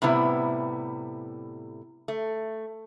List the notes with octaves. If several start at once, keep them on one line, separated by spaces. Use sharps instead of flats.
A2 C3 G3 B3 E4
A3